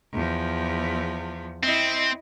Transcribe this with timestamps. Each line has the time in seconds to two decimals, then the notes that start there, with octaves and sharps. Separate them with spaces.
0.12 E2 F3
1.63 C4 E4 D#5